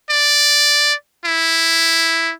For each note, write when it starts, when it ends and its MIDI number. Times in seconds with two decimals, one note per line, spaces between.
0.11 0.93 74
1.26 2.33 64